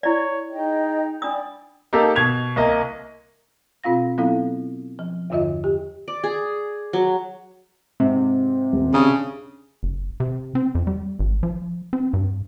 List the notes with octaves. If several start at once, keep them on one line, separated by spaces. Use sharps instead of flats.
E4 C#5 D5
D#4 G#4 D#5 G5
D4 D5 G5 B5 D#6
A#3 D#4 G4 A4
B2 G#6 F7
C2 A#3 D#5
B2 C4 F4 F5 A#6
F#3 B3 C4 E4 A4 F5
F3
E2 G2 D3 F4 D#5 E5
G4
D5
G#4
F#3
G#2 C3
D#1
C#3 D4 D#6
F#1
C3
C4
F2
G3
G#1
F3
C4
G2